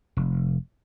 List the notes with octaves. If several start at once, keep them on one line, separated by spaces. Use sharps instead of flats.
F1